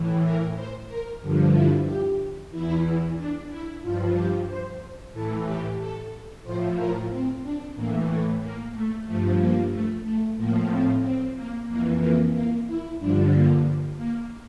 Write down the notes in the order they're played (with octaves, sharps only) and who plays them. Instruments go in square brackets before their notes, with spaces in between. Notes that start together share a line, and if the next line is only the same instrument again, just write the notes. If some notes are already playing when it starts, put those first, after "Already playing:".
Already playing: [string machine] A2 E3
A#4
C5
A#4
G2 D3 F3
E4
G4
E2 E3 E4
D4
E4
G2 F3 F4
G4
C5
A2 E3 A4
G4
A4
A2 F3 C5
A#4
C4
D4
A2 E3 A#3
A3
A#3
A3
G2 F3 A3
A#3
A3
A3
A2 F3 A#3
C4
C4
A#3
F2 E3 A#3
A#3
A#3
E4
G2 D3 F3 D4
A#3
A#3